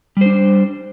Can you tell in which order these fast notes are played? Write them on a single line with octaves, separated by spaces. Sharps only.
G3 C5 D4